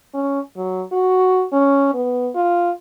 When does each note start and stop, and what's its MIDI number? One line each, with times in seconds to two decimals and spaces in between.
0.14 0.40 61
0.56 0.83 54
0.92 1.44 66
1.53 1.92 61
1.94 2.30 59
2.35 2.71 65